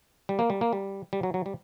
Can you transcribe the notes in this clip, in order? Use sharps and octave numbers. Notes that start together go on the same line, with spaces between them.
G3
A#3
G3
A#3
G3
G3
F#3
F#3
G3